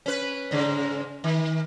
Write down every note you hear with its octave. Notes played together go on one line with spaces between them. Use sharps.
C#4 B4
G#2 C#3
D#3